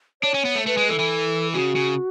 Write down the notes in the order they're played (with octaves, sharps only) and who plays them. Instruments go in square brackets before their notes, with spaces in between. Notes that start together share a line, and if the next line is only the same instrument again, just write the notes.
[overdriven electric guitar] D4 [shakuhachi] C#5
[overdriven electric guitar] C#4
B3
A3
[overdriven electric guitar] A3 [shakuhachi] B4
[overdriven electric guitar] G#3
[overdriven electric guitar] E3 [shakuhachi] A4
[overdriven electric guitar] E3
[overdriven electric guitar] C#3 [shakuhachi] F#4
[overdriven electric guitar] C#3